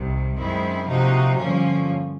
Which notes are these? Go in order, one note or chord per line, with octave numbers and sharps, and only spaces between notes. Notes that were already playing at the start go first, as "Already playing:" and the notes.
Already playing: C2 C3 D#3 G3
F#2 D#3 G#3 C4 E4
C3 F3 A#3 D#4 F#4
G2 D3 F3 A#3 C#4